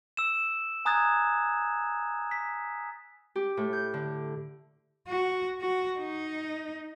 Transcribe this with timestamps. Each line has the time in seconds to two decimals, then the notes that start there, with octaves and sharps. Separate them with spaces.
0.17 E6 E7
0.85 G#5 A#5 D#6 F#6 G#6 A6
2.31 B6
3.36 G4
3.57 A2
3.73 G6
3.94 D3
5.08 F#4
5.61 F#4
6.00 D#4